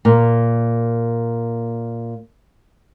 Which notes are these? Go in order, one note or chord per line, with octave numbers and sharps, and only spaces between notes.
A#2 A#3